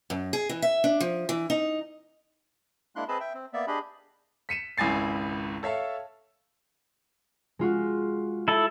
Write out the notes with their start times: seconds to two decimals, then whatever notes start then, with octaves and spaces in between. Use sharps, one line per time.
0.10 F#2
0.33 G#4
0.49 E3
0.62 E5
0.84 D4
1.00 F3
1.29 E3
1.50 D#4
2.96 G#3 A#3 D4 E4 C6 F#6
3.08 C4 G#4 B4 D#5 A5 B5
3.20 E5 G5
3.34 C4
3.53 A#3 B3 D5 E5
3.67 D4 G4 G#4 D#5 B5
4.49 B6 C#7 D#7 E7
4.78 G#1 C#2 E4 G#5 A6 C7
5.63 A4 C#5 E5 F5 A5
7.59 G#3 F4 F#4
8.48 E4 A4